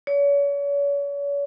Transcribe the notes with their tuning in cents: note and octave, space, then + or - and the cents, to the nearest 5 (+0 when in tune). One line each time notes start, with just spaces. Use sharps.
C#5 +40